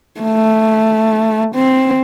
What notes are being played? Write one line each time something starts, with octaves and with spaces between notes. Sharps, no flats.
A3
C4